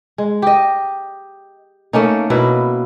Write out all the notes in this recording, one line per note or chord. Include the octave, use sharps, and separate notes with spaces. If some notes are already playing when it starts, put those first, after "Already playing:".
G#3
G4 D#5
A3 A#3 C#4 D#4
B2 A#3 E4 B4